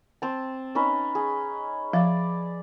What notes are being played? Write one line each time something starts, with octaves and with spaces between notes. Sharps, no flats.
C4 A5
C#4 D#4 B4
G#4
F3 D5 E5